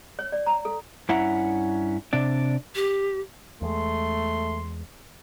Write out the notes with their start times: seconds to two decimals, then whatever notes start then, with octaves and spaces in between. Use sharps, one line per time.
0.19 C#5
0.32 D5
0.46 A#5
0.65 A4
1.09 G2 C#4 E4 E5 F#5 A#5
2.13 C3 D4 D5
2.75 G4
3.62 E2 G#3 A3 C6